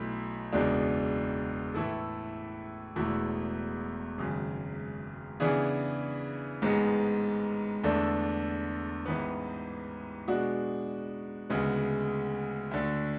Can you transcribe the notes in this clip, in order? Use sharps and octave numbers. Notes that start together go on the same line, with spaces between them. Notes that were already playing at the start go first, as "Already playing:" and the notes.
Already playing: B1 B2 A3 E4
F#1 E2 B2 G#3 D4
A2 E3 A3 E4 A4
E1 E2 B2 A3 E4
G#1 F#2 C#3
C#3 E3 B3 D4 G#4
A1 G#2 G#3 B3
E2 D3 A3 D4 A4
A1 G#2 E3 B3
B2 G#3 D4 F#4
D2 C#3 G#3 B3
D2 D3 A3